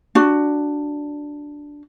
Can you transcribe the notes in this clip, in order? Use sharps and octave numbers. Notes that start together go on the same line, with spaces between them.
D4 F#4